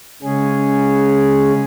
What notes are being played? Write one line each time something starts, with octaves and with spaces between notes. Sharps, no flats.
C#3 G#3 C#4 G#4